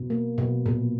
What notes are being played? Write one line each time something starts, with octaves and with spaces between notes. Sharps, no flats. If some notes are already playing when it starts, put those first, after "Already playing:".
Already playing: B2
A#3
B2
A#2